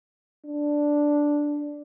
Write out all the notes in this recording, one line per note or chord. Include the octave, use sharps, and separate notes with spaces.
D4